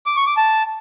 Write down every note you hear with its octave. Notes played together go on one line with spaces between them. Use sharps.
D6
C#6
D6
A5